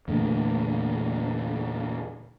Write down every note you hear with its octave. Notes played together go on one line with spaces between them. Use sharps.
E2 A#2 D3 A3